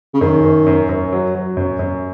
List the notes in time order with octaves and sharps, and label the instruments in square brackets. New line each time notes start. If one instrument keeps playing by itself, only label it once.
[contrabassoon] C#3
[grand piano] F#2 [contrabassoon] D#3
[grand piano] F#2
F#2
F#2
F#3
F#3
F#2
F#2